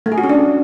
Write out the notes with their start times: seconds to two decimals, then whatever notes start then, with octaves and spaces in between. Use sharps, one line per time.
0.06 A3
0.12 G#4
0.18 F#4
0.24 C#4
0.29 D4